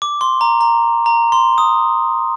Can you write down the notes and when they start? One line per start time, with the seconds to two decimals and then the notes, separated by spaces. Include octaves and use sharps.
0.02 D6
0.21 C6
0.41 A#5
0.61 A#5
1.06 A#5
1.32 C6
1.58 D#6